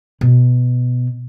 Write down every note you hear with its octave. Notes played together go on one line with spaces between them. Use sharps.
B2